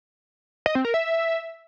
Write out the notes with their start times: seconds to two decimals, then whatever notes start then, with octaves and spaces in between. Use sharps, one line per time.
0.66 D#5
0.75 C4
0.85 A#4
0.94 E5